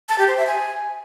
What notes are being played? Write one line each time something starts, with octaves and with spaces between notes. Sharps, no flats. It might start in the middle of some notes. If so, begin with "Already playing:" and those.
A5
G4
C5
E5
G#5